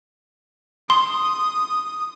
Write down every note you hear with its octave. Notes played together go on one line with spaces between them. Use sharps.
C6 D#6